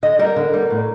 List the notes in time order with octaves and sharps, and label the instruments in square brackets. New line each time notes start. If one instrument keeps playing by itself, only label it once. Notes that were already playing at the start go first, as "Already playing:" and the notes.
[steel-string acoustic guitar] D3 D#5
G3 B3 A#4
D3
G3 B3
A2